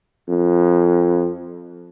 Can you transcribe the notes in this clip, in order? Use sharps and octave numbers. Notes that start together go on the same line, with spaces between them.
F2